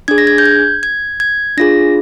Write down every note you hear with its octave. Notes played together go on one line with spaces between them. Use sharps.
D4 G#4 G#6
A#6
G#6
G6
G#6
G#6
G#6
D4 F4 G#4 A#6